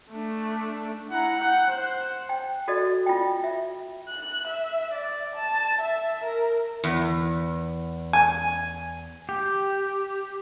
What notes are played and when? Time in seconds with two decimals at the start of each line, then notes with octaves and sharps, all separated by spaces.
0.12 A3 D4
1.11 E4 F#5 A#5
1.40 F#5 G5 F#6
1.69 C5 F#5 F#6
2.29 G5
2.68 F#4 A4 D5 D#5
3.06 F4 G5
3.44 E5
4.09 F#6
4.47 E5
4.93 D5
5.36 A5
5.82 E5
6.24 A#4
6.84 E2
8.13 G#5
9.29 G4